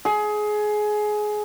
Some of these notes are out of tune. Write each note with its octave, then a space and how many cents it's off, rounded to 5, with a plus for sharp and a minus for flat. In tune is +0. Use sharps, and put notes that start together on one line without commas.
G#4 +20